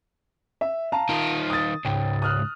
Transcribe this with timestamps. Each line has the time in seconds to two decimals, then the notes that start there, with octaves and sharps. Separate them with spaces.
0.61 E5
0.92 F5 A5 A#5
1.09 D#3 F4
1.50 D#6 A6
1.85 C#2 G#2 G5
2.22 D#6 F6 F#6